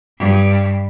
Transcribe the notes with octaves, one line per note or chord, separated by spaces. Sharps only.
G2